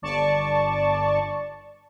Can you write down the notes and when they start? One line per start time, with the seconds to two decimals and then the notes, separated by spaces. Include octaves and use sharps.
0.02 G1 D5 A5 C#6